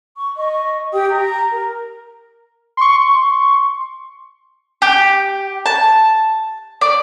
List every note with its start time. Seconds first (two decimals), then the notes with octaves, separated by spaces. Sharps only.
0.17 C#6
0.38 D#5 C#6
0.93 G4 G5 D#6
1.09 A#5
1.51 A#4
2.77 C6 C#6
4.82 G4
5.66 A5
6.81 D5